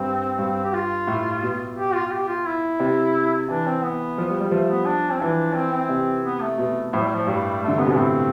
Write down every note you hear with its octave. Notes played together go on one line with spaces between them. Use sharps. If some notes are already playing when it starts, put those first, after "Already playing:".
Already playing: G2 C4
G2
G4
F4
A2
B2
G4
F4
F4
G4
F4
E4
C3
E3 D4
C4
B3
F3
G3
G3
F3 A3
B3
D4
C4
E3 D4
C4
C4
C3
B3
A3
B2
A2 F3
G3
F3
G2 G3
A3
D3
C3 B3
B2
D4
A2 C4